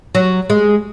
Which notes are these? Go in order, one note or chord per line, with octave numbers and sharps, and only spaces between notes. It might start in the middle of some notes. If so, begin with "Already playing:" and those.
F#3
G#3